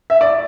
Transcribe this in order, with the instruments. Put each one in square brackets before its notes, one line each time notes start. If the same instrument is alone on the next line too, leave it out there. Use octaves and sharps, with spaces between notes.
[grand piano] E5
D5